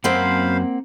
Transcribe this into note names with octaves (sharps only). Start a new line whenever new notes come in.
F#2 A#3 C4 C5 F5 F#5 B5